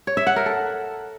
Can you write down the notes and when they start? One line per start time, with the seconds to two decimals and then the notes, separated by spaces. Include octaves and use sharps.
0.07 C#5
0.17 E5
0.27 F#5
0.36 A#4
0.46 A4